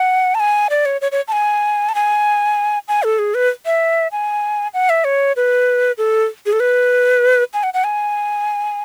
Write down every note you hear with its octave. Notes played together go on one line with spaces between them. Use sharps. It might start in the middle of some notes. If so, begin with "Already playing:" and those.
Already playing: F#5
A5
G#5
D5
C#5
C#5
C#5
A5
G#5
A5
G#5
G#5
A4
G#4
B4
E5
G#5
F#5
E5
C#5
B4
A4
G#4
A4
B4
G#5
F#5
F#5
G#5